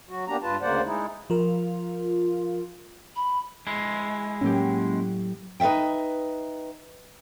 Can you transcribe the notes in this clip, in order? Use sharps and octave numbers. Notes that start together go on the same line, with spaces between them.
F#3 F#4
A#3 B3 D4 G4 A#5
G2 F4 B4 A5
D2 C#3 A#3 C5 D5 F#5
G#3 D#4 E4
F3 F4 A#4
B5
G#3 E4
A2 F#3 A#3 C#4 G4
D#4 B4 C5 E5 G5